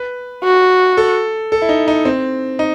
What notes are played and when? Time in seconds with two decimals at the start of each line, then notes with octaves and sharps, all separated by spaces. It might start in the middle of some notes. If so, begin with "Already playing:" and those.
Already playing: B4
0.43 F#4
0.97 A4
1.52 A4
1.62 E4
1.69 D#4
1.88 D#4
2.05 C4
2.59 D#4